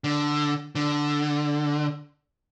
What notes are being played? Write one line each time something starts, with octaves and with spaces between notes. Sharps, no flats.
D3
D3